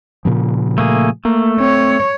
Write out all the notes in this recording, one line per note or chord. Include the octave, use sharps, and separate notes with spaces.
A#2 C#3 F3
A3 A#3 G#4
A3 A#3
C4 C#5